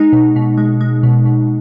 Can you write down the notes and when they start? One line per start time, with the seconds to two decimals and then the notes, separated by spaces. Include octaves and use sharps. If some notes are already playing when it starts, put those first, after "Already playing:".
Already playing: G#3 D#4
0.12 B2
0.36 B2
0.58 G#3
0.81 G#3
1.03 B2
1.25 B2